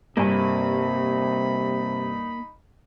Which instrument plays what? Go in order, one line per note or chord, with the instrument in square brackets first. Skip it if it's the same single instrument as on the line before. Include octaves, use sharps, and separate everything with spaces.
[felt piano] G2 [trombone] C3 [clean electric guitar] A#3 G#5 [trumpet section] D#4 B5